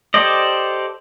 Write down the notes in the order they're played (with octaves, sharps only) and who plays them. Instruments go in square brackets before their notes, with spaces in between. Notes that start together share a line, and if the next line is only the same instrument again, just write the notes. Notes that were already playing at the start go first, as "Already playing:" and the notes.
[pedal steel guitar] G4 A4 C5 D5 D#5